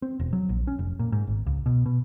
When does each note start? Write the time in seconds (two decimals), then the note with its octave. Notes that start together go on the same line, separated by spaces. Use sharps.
0.02 C4
0.20 E1
0.33 F#3
0.49 A#1
0.67 C#4
0.79 F1
0.99 A#2
1.12 G#2
1.27 G#1
1.47 C#2
1.66 B2
1.86 B2